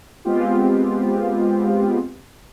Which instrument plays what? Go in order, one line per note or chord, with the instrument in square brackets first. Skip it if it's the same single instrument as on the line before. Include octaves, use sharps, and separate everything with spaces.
[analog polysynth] G#3 B3 C4 F4 G4